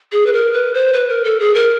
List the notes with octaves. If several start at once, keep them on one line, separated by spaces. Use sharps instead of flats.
G#4
B4
A#4
B4
C5
B4
A#4
A4
G#4
A#4